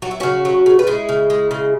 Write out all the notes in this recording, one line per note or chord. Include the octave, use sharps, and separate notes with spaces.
F#3 F#4
E4
C#3 C#4 F#4
F#3
C#3
B4
G#3 E4 G#4
C#3
G#3
C#3